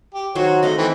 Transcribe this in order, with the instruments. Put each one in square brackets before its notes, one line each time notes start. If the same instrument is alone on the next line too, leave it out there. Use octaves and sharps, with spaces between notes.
[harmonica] G4
[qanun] D#3 F#3 C5 [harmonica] F#4 C#5
[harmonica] A3 [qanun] D#5 F5 F#5
[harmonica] E3 A3 C4